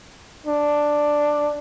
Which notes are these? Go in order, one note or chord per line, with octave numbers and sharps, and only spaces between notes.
D4